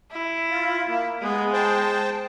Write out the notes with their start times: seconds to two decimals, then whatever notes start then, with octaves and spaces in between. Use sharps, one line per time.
0.11 E4
0.50 F4
0.88 A#3
1.22 G#3 B3
1.53 C5 G5 A5